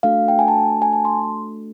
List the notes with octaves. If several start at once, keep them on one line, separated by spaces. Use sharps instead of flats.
A3 D4 F#4 A4 F5
G5
G#5
A5
G#5
A5
C6